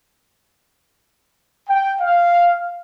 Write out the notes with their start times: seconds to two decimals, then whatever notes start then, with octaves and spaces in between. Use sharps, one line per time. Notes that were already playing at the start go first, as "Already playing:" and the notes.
1.69 G5
2.01 F5